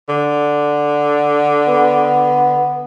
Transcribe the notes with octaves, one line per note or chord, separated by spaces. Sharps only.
D3
B3